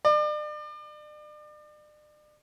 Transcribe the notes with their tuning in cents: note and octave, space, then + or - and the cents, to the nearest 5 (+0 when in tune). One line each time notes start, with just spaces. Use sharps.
D5 +40